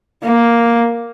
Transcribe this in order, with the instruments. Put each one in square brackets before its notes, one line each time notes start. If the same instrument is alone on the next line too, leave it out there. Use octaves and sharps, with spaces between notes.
[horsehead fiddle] A#3